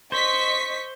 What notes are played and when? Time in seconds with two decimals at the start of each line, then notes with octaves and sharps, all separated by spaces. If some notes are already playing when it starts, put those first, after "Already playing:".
0.12 C5 D#5 C#6 B6